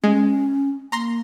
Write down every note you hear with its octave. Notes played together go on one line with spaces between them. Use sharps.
G#3 C#4
A#3 A#5 C6 A#6